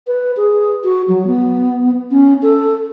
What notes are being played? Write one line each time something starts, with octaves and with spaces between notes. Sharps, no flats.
B4
G#4
F#4
F#3
B3
C#4
A4